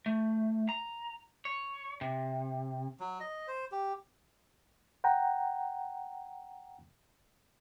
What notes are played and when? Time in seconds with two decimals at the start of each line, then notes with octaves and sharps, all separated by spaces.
0.06 A3
0.69 A#5
1.45 C#5
2.01 C3
3.00 F#3
3.20 D#5
3.47 C5
3.72 G4
5.04 F#5 G5 A#5